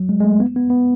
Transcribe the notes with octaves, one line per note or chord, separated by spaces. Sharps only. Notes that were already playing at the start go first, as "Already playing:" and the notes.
Already playing: F#3
G#3
G#3
A3
B3
B3
B3